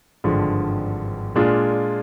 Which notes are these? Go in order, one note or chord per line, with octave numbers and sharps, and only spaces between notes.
G#1 G2 D3 F3 G#3
A#2 G#3 D4 F4 G#4